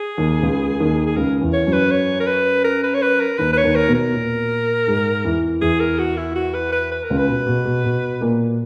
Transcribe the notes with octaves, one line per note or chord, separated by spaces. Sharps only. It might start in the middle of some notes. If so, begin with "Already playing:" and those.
Already playing: G#4
D#2 D#3
C#2 C#3
D#2 D#3
G#4
C#2 C#3 A#4
E2 E3
C#5
F#2 F#3
B4
C#5
A#4
B4
A#4
B4
C#5
B4
A#4
D#2 D#3 B4
B4
C#5
D#2 D#3
A#4
B2 B3
A#4
A#2 A#3
G#2 G#3
E2 E3
E2 E3 G#4
A#4
F#4
E4
F#4
B4
B4
B4
A#4
C#2 C#3
B4
B2
B2
B2
B2
A#2 A#3